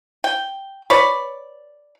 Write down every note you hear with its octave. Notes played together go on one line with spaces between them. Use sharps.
G5
B4 C#5 D5